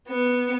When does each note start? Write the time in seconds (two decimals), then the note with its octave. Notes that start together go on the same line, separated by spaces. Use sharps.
0.08 B3